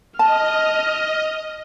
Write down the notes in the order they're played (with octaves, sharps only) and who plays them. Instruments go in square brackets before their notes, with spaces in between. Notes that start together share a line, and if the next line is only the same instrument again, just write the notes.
[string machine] D#5 [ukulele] A5 [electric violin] F6